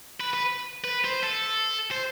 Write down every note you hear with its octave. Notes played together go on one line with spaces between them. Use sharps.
B4
B4
B4
C5
A4
C5